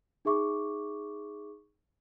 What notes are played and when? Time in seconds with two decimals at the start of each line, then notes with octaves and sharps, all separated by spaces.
0.25 D#4 G#4 E5 C#6 D6